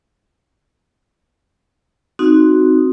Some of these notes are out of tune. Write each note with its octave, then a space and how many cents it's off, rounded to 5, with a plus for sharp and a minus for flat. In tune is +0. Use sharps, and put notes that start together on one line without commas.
C4 +0 D#4 +5 F#4 +0